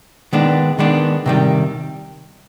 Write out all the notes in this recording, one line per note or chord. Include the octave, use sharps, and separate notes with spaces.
D#3 G#3 B3 D4
D#3 G#3 B3 D4
C3 D#3 G3